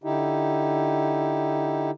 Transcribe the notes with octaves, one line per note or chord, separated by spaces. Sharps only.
D3 D#4 E4 G4